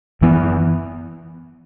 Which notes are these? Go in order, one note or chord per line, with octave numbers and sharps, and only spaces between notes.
F#2 E3 B3